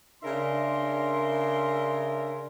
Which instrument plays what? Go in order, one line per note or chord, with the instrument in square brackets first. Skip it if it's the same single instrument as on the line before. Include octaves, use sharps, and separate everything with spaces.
[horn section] C#3 D4 A#4 E5 C6